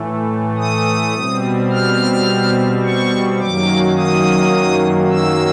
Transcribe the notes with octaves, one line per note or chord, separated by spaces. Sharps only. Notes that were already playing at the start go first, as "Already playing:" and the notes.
Already playing: A2 E3 A3
D#6
B2 G3 C4
F6
C#6
F#2 D#3 F#3 A#3 D6
D#6
E6